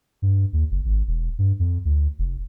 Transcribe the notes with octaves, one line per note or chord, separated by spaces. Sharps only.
G2
D#2
F#1
G#1
E1
G2
F2
D2
F1